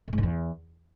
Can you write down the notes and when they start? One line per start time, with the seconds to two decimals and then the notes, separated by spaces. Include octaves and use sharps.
0.08 A2
0.13 G#2
0.18 D3
0.23 E2